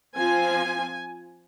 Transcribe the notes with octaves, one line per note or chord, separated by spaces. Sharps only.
F3 C4 F4 G#5